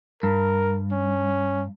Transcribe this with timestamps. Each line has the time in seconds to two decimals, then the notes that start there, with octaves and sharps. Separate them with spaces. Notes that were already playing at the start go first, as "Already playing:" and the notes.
0.23 G2 A#4
0.92 C#4